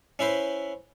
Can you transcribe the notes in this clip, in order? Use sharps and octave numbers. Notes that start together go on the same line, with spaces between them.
C#4 E4 B4 C5